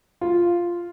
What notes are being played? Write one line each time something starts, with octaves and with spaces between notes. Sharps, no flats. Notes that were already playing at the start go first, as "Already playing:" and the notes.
F4